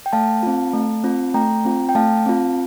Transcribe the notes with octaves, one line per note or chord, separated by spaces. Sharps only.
G5
A3 F5 A5
C4 F4
A3
C4 F4
A3 G5 A#5
C4 F4
G5
A3 F5 A5
C4 F4